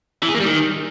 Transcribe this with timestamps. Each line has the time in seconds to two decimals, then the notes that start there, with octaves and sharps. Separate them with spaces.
0.23 E3
0.29 G#4
0.34 A#3
0.40 G3
0.46 D#3